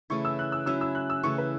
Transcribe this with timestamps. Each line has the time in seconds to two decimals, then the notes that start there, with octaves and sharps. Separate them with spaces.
0.10 C#3 E3 A3 E4 C#6
0.25 E6
0.39 F#6
0.52 E6
0.66 F#3 C#4 E4 E6
0.81 E6
0.95 F#6
1.10 E6
1.23 C#3 E3 A3 C#6
1.38 B4